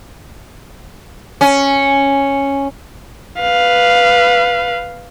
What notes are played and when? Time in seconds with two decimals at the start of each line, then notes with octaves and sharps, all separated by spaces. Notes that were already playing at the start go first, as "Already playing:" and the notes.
1.41 C#4
3.41 B4 F5